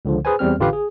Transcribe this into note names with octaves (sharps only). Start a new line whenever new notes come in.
C#2 D3 F3
G#4 B4 C5 G#5
E2 G3 C4 F6
A1 D3 F4 G4 B4 F5
G#4